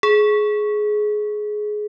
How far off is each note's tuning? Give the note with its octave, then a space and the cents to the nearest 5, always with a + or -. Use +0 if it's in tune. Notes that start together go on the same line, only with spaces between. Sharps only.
G#4 +20